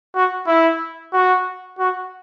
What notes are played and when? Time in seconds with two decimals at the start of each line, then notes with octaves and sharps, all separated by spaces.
0.15 F#4
0.47 E4
1.13 F#4
1.79 F#4